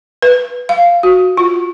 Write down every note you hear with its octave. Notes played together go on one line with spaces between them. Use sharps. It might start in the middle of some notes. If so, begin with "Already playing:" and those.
B4
F5
F#4
F4